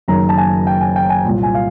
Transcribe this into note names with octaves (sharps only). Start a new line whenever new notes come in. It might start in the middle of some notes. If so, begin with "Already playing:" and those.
F#1 F#2 D#3 A#5
A5
G#5
G5
G#5
G5
G#5
C2 A#2
G#5
F5